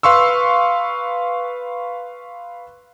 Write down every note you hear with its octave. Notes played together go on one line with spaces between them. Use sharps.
B4 F5 C6 C#6 E6